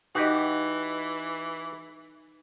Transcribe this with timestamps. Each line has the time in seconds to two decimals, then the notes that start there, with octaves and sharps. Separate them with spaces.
0.15 E3 D#4 F#4 G4 D#5